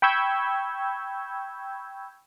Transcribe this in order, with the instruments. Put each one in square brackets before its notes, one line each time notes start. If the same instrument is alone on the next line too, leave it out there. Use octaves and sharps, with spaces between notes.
[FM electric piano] G5 B5 C#6 E6 G6 G#6